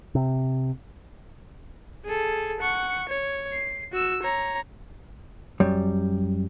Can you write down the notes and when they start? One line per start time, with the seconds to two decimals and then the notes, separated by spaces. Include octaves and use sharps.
0.15 C3
2.04 G#4 A4
2.60 F#5 C#6
3.09 C#5
3.53 C7
3.92 F#4 E6
4.23 C#5 A#5
5.60 F#2 G3